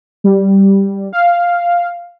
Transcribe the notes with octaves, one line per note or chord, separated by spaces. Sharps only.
G3
F5